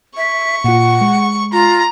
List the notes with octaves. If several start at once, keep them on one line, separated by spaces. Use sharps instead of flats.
E5 C#6
A#2 F4 F#5
G#3
F4 A#5